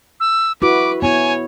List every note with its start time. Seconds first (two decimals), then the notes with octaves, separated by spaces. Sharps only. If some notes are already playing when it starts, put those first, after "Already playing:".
0.20 E6
0.62 E4 F#4 B4 D6
1.02 B3 E4 C#5 G#5